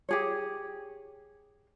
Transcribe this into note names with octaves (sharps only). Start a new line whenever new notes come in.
G4 G#4 C#5